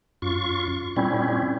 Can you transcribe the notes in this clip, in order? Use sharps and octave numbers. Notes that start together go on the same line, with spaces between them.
F#2 F4 C#6
A#2 G3 C4 C#4 E4